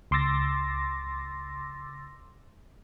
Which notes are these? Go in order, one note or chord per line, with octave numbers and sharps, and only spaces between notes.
C#2 C6 D6 E6 A6 A#6